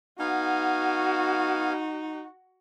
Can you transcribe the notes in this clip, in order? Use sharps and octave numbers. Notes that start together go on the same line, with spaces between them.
B3 D#4 F#4 F5 G#5